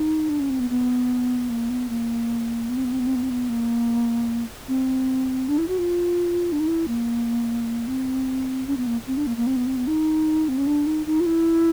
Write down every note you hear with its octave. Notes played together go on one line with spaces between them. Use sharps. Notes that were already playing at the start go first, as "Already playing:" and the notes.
Already playing: D#4
D4
C#4
C4
B3
B3
A#3
B3
A#3
B3
C4
B3
C4
B3
C4
B3
C4
B3
A#3
C4
D4
E4
F#4
F4
D4
D#4
E4
A#3
C4
C#4
B3
A#3
C4
D4
A#3
A#3
C4
B3
C4
B3
D#4
C4
C#4
D4
D#4
D#4
F4
E4